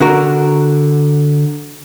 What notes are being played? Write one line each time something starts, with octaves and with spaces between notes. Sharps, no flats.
D3 F#4 A#4